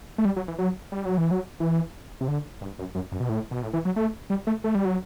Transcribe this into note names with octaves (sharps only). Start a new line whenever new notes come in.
A3
G3
F#3
E3
F#3
G3
F#3
E3
F#3
E3
C3
D3
G2
F#2
F#2
F#2
B2
A2
B2
A2
E3
F#3
A3
G3
A3
A3
G3
F#3